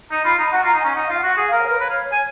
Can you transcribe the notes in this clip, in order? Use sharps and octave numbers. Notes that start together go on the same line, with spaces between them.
D#4 A#5
F4 B5
D#4 A#5
F#4 F#5
F4 A#5
D#4
C#4 G#5
D#4 F#5
F4 F5
F#4 F#5
G#4 F#5
F5
A#4
C#5
A#4 B4
B4 C#5
F5
G#5